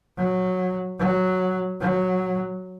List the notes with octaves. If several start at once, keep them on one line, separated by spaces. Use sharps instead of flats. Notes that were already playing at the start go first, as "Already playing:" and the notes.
F#3
F#3
F#3